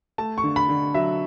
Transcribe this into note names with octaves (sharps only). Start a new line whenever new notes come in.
A3 A5
C#6
D3
B5
D3
F#3 E5